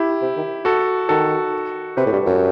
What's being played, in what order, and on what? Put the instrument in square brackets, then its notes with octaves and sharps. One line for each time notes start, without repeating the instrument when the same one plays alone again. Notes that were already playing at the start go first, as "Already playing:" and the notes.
Already playing: [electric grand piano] E4 G4
[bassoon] C3
D#3
[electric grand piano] F#4 A4
[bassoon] D#3 [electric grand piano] F#4 A4
[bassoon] C3 [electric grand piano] G4 B4
[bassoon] A2
G2
F#2